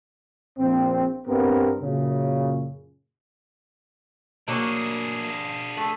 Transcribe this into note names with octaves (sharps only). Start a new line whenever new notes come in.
A#1 F3 C4
G2 B3 C4 A#4
F#2 A#2 C#3
F#3 A#3 D4 G#4 C#5
A3